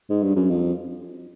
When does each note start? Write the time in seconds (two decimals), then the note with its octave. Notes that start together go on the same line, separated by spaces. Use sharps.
0.10 G#2
0.23 G2
0.36 F#2
0.50 F2